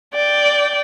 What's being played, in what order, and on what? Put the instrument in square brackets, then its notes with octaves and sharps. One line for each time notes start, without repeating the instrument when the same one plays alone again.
[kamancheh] D5 G5